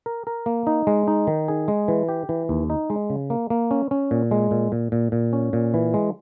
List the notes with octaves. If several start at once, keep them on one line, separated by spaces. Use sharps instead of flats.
A#4
A#4
A#3
D#4
G#3
D#4
D#3
G#4
G#3
E3
G4
E3
D#2
D#4
G#3
C#3
A#3
A#3
C#4
C#4
A#2
G#3
A#2
A#2
A#2
A#2
C#4
A#2
E3
G#3